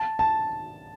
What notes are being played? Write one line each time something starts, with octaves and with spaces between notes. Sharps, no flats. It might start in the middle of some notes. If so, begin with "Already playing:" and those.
Already playing: A5
A5